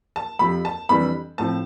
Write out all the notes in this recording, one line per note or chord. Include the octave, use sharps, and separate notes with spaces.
A5
F2 C3 F3 B5
A5
F2 C3 E3 G3 D4 B5
A2 F3 C4 A5